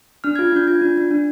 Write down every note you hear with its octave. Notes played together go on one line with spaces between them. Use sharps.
D4 F6
F4 G#6
D4 G6
F4 G#6
D4
D4
D4